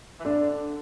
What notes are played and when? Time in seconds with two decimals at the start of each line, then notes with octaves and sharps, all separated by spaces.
0.20 E3
0.24 D3 D4